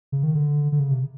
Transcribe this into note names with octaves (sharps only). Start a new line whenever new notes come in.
C#3
D#3
D3
D3
C#3
C3